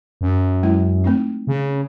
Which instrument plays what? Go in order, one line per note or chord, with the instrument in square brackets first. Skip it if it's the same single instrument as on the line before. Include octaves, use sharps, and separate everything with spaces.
[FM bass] F#2
[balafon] F#3 G#3 E4
A3 C4 D#4
[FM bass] C#3